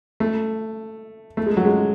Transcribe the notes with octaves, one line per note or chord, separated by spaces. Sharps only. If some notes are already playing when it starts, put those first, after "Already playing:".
A3
A3
G#3
F#3
G#3